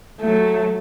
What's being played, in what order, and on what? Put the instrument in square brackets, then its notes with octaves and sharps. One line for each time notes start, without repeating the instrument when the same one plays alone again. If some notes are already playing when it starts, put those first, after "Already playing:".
[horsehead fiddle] F#3 A3